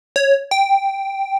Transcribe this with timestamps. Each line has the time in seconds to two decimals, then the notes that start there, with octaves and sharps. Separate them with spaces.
0.16 C#5
0.51 G5